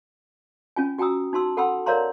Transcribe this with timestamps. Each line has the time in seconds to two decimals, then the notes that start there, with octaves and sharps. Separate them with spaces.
0.76 C#4 F4 G#5
0.98 F#4 G5 G#5 A#5 D#6 E6
1.33 D#4 F#4 A5 C6 E6
1.57 A4 F#5 G5 B5 C6 E6
1.86 A#4 C#5 D5 F5 A#5 C6